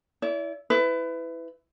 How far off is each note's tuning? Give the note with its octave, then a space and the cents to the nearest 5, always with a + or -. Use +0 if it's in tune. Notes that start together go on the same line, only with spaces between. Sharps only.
E4 +0 D5 -40
E4 +0 B4 +25